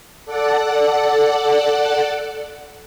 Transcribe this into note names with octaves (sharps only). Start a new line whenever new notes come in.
A4 D5 F#5